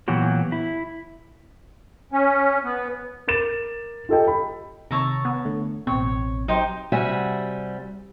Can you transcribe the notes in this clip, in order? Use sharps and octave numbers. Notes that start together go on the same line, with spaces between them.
A#2 E3 F#3 B3 F#4 G4
E4
C#4
B3
A#4 D6 A6 E7
F4 G4 A4 D#5 G5
B5
C3 D#3 C#5 A5 A#5 E6
B3
D3 A3
A1 B2 C4 C#5
F#3 D#4 G4 C5
C3 G3 F#4 E5 G#5